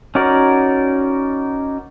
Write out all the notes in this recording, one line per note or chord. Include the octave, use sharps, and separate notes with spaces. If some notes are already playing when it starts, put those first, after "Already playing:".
C#4 D#4 F#4 A#4 D5